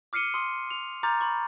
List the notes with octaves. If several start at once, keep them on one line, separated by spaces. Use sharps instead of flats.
D6 F6 C7 C#7 D#7 G7
C6 D#6
F7
A#5 C6 D6 F6 G6 A6
B5 C#6